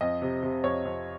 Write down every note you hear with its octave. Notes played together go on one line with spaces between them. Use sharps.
F2 D#5
C3
C3
F2 C#5
F2